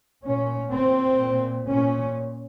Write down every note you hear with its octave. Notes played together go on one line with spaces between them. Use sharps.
A#2 C#4
A#2 C4
A#2
A#2 C#4